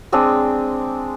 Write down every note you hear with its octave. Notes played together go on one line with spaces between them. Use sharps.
G#3 C4 D4 G#4